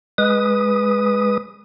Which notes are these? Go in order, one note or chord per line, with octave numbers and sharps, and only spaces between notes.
G#3 B4 D#6